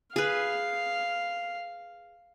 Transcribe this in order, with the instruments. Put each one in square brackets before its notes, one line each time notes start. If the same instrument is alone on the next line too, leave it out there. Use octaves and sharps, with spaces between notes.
[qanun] G#4 B4 [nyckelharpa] F5